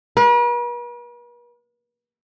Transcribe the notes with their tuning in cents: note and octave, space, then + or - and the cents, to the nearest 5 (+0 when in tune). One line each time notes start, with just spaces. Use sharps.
B4 -45